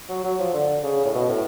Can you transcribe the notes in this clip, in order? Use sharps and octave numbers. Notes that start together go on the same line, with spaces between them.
F#3
F#3
F3
D3
C#3
A2
B2
A2